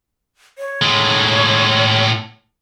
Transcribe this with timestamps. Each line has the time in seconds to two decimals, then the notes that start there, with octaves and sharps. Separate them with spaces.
0.58 C#5
0.82 A2 G#3